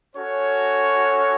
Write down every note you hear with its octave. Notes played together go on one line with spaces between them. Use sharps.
C#4 F#4 A4 C#5